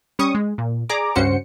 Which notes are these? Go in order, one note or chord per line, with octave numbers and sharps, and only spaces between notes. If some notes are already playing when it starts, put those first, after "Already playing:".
G3 C#4 C#6 D#6
G#3
A#2
G#4 D5 A#5 D6
C#2 G2 C#4 F#4 C5 C#7